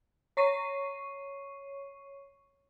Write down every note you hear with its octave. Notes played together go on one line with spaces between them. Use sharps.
C#5 C#6 C7 D#7